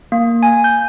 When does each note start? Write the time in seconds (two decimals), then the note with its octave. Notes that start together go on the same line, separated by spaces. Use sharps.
0.12 A#3
0.43 G#5
0.64 G6